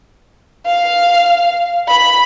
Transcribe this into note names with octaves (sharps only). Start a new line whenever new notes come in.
F5
B5